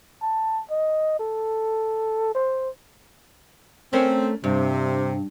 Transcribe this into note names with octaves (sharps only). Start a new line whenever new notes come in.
A5
D#5
A4
C5
A3 C4 C#4 A#4
G2 C3